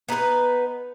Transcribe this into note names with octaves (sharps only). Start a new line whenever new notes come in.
B3 D#4 G#4 B4